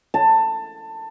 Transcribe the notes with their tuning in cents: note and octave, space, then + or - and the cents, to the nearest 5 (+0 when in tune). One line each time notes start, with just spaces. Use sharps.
A5 +20